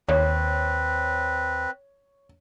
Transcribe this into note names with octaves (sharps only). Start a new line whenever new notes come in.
D#2 C4 B4 C#5